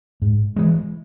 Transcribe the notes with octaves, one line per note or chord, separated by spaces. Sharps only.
G#2
E3 G#3